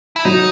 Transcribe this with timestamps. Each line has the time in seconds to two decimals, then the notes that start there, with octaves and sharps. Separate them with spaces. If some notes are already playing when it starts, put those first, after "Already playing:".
0.16 E4
0.25 F#3 D#4